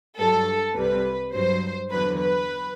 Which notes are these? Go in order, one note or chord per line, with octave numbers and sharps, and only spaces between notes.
G2 F#3 A4
C2 C3 G3 B4
G2 F#3 C5
E2 D3 F#3 B4
B4